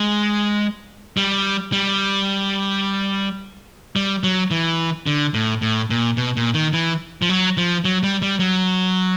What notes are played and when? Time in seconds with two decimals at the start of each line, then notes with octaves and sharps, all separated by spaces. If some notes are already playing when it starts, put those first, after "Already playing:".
Already playing: G#3
1.17 G3
1.72 G3
3.96 G3
4.23 F#3
4.51 E3
5.06 D3
5.34 A2
5.62 A2
5.90 A#2
6.17 B2
6.37 A#2
6.54 D#3
6.73 E3
7.22 F3
7.29 F#3
7.57 F3
7.85 F#3
8.03 G3
8.22 G3
8.39 F#3